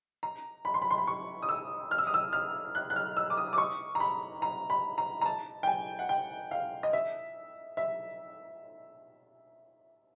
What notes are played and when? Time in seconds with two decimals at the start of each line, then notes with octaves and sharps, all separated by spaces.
0.23 A#5
0.65 B5
0.74 C6
0.82 B5
0.91 C6
0.98 B5
1.07 C#6
1.42 D#6
1.49 E6
1.91 F6
1.98 E6
2.07 D#6
2.14 E6
2.33 F6
2.75 F#6
2.90 F#6
2.96 F6
3.17 E6
3.30 D6
3.37 D#6
3.53 D6
3.58 C#6
3.95 A#5
4.00 B5
4.42 A#5
4.70 B5
4.98 A#5
5.21 A#5
5.26 A5
5.63 G5
5.67 G#5
5.99 F#5
6.09 G5
6.51 F5
6.83 D#5
6.93 E5
7.77 E5